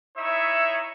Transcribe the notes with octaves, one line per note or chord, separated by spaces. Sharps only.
D#4 E4 C#5 E5